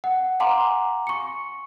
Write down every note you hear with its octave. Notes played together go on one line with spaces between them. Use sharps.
F#5
F5 F#5 G#5 A#5 C6 D6
C#6 C#7